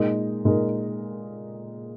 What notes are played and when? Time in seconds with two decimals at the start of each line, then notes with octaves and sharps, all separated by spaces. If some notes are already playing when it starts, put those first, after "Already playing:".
Already playing: A#2 G#3 D#4 A#4
0.45 A#2 G#3 D#4 A#4